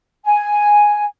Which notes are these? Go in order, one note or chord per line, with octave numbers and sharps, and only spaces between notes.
G#5